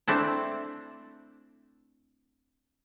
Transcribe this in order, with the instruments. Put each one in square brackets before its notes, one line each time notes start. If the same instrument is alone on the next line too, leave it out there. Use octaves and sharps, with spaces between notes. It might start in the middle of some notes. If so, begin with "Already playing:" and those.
[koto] A3 C4 D4 E4